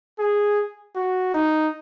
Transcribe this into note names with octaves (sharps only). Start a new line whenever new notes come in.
G#4
F#4
D#4